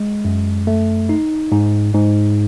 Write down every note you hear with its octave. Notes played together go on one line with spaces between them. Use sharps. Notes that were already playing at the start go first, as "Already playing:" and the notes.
Already playing: G#3
F#2
A3
D#4
G#2
G#2